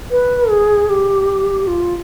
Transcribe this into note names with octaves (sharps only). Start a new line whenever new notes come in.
B4
G#4
G4
F4